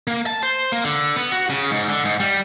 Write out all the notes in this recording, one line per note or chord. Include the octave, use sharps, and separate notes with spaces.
A#3
A5
C5
A#3
D3
B3
F#4
C#3
G#2
D3
G#2
G3